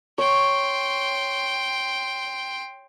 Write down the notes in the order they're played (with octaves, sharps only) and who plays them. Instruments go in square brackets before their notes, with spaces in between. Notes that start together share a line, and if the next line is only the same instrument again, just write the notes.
[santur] C#5 [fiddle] G5 C6